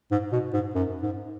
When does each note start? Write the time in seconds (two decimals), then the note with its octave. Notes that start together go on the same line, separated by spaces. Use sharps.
0.11 G#2
0.32 B2
0.54 G#2
0.75 F#2
1.02 G#2